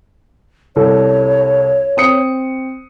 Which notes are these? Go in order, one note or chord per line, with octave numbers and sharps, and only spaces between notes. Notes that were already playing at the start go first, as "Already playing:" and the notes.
C2 A4 C#5
C4 D#6 C#7